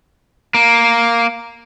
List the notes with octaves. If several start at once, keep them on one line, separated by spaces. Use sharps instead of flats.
A#3